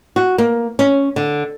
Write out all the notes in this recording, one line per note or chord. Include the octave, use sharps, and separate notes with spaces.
F#4
A#3
C#4
D3